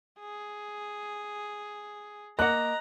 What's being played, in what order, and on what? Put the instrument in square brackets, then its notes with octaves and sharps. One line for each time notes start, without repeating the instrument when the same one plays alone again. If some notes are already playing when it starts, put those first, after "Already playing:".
[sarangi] G#4
[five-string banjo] A#3 F#5 [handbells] D#5 [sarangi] A#5 [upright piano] F#6